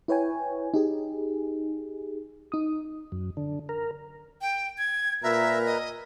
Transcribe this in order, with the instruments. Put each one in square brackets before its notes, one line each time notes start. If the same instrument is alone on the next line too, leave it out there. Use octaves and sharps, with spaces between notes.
[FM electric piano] E4 B4 C#5 G5 G#5
D#4 G4 G#4
D#4 D#6
[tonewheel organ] F#2
D3
A#4
[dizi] G5
G#6
[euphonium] A#2 [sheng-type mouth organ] A#4 B4 A#5 [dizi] E5
[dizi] D#5